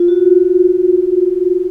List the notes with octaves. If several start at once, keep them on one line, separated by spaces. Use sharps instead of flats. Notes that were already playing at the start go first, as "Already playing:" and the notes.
Already playing: F4
F#4